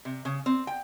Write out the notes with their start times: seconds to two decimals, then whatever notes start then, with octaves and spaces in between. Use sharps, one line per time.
0.05 C3
0.25 C#3
0.46 C4
0.67 G5